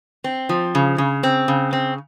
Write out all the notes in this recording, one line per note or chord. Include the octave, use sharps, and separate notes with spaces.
C4
F3
C#3
C#3
C4
C#3
C4